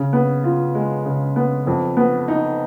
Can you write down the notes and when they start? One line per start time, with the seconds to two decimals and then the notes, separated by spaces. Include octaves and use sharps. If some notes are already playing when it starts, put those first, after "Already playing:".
Already playing: C#3
0.13 B3
0.44 F4
0.75 G#3
1.06 C#3
1.36 B3
1.67 F2
1.97 B3
2.28 D#4